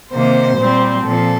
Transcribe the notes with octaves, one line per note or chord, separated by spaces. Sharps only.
C3 D#3 A#3 C5
A#2 G3 C4
A#2 F3 C4 A4